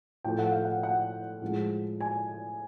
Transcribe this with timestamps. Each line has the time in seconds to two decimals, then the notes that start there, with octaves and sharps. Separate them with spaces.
0.25 A2 F3 A3 G5
0.39 F#5
0.52 F5
0.65 F#5
0.83 F#5
1.42 A2 F3 G#3
2.01 G#5